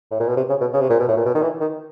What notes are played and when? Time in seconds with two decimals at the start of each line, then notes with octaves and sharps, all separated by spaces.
0.11 A2
0.20 A#2
0.28 B2
0.37 C3
0.49 C#3
0.61 B2
0.73 C#3
0.81 C3
0.90 A#2
0.99 B2
1.08 A2
1.17 A#2
1.25 B2
1.35 D#3
1.42 E3
1.61 D#3